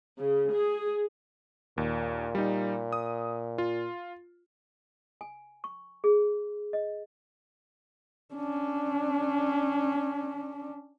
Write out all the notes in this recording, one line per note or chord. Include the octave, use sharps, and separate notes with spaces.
C#3
G#4
D#2 A#2
G3 D#4
D#6
F4
G#5
C#6
G#4
D#5
C#4 D4